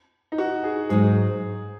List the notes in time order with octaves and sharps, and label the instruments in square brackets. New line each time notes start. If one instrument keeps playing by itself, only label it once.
[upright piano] D#4
F#4
G#4
[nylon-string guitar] G#2 F#3 D#4 [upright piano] G#4